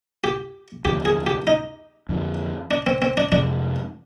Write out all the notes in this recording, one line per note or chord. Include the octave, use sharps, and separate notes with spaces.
G4
D#2 D3 F3 G4
G#4
G4
D#4
F2 D3 F3
D4
C4
C4
D4
F2 C3 F3 G#3 D4